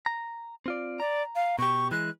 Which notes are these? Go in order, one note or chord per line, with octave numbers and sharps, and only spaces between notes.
A#5
C4 F4 D5
D5 A#5
F5
B2 G4 C#6
E3 G#3 F#6